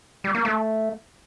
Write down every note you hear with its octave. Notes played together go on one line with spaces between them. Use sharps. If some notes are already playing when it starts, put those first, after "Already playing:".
G3
A#3
A3